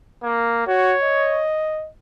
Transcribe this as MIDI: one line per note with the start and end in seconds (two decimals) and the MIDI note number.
0.23 0.66 58
0.67 0.95 66
0.67 1.47 73
1.03 1.89 75